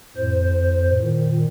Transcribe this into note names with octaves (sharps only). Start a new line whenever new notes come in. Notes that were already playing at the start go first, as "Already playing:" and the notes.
F2 A2 C5
A#2 D#3